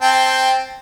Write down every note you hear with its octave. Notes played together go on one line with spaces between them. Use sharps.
C4 G5 A5